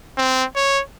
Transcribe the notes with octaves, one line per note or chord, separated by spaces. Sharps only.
C4
C#5